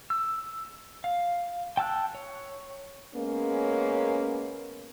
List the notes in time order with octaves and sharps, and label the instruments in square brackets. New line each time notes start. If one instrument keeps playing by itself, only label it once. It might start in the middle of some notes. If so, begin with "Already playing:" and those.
[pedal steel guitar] E6
F5
G5 A5 E6 F#6
C#5
[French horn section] G#3 A#3 B3 C#4